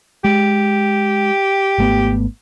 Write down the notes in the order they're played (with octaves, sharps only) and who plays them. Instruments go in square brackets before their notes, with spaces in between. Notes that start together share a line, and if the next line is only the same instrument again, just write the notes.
[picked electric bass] G#3 [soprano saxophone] G4
[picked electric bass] G#1 A3 B3